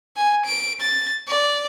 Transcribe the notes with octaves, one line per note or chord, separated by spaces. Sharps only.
G#5
D7
A6
D5